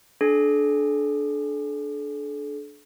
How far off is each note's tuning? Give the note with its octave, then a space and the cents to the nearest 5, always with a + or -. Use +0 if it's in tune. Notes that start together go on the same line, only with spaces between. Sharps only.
D4 +0 A4 -40